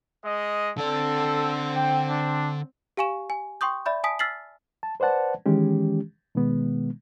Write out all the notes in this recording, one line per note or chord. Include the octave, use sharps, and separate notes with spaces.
G#3 D#5
D3 C4 A4 D5
G5
D4
G4 F5 G#5 C#6 E7
G#5
G5 C6 C#6 D#6 G6
D5 E5 B5 G6
G#5 A5 D#6 B6 D7
E6 F6 A6 B6 C7 F#7
A5
B4 C5 D5 F#5 A5
D#3 E3 G#3 C#4 G4
B2 D#3 G#3 B3